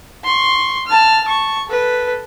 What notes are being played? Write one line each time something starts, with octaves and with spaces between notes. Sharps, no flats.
C6 C#6
A5 F6
A5 C#6
A4 B4